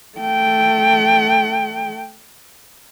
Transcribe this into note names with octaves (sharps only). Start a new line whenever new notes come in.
A3 G5